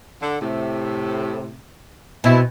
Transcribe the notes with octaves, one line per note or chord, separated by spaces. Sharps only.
D3
A2 C3
B2 C4 E4